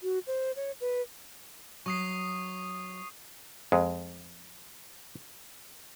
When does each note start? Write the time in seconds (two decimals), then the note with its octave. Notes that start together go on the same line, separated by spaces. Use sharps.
0.03 F#4
0.27 C5
0.56 C#5
0.81 B4
1.86 F#3 C#6 D#6 C7
3.72 F2 G#3